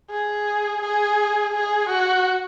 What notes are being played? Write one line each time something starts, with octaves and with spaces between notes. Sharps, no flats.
G#4
G#4
G#4
F#4